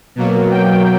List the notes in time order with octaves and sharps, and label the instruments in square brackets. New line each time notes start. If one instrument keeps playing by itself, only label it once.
[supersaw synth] B2 F#3 A#3
G5